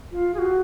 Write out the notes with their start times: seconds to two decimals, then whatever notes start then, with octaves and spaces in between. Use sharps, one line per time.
0.12 F4
0.34 G#4
0.39 F#4